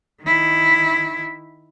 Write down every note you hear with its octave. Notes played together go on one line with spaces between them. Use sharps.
D#3 E4